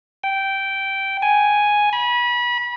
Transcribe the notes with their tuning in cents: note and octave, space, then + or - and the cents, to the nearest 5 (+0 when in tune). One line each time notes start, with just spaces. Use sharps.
G5 -10
G#5 +0
B5 -30